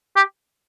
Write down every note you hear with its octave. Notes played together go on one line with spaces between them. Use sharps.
G4